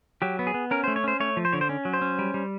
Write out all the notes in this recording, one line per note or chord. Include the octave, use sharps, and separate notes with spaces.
F#3 G4
B3
G#4
B3
C#4 A#4
C5
A3
C#5
C#4 C5
A3 C#5
F3
C5
D3 C#5
C5
C#4
F#3
C5
C#4
G3
G3